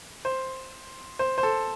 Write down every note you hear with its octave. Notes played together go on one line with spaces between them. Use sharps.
C5
C5
C5
A4